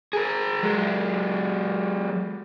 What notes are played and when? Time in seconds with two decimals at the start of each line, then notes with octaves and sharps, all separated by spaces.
0.13 G#4 A#4
0.63 F#3 G#3